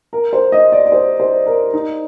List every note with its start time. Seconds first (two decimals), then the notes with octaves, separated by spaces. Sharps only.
0.13 A#4
0.33 C5
0.52 D#5
0.72 D5
0.86 D5
0.92 C5
1.20 C5
1.46 A#4
1.74 D#4